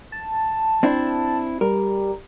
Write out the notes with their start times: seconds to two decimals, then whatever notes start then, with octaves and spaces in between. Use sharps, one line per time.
0.12 A5
0.83 C4 D4 E4
1.61 G3 A#4